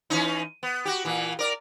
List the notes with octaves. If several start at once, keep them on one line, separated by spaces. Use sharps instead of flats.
E3 C#4 D#4
B3
F#4 G4
A#2 E3
A#4 D5